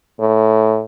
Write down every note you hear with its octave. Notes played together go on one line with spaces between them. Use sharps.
A2